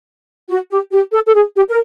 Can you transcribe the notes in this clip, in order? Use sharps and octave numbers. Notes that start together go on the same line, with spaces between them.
F#4
G4
G4
A4
A4
G#4
G4
A#4